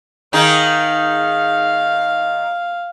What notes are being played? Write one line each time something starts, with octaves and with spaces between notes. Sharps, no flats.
D#3 D#4 G#4 F5